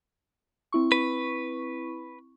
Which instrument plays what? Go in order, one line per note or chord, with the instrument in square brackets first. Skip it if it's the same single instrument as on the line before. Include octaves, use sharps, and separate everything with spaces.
[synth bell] C4 E4 C#6
[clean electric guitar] B4